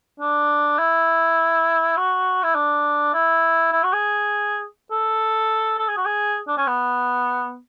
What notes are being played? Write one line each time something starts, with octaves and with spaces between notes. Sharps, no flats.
D4
E4
F#4
E4
D4
E4
E4
F#4
G#4
A4
A4
G#4
F#4
G#4
D4
C#4
B3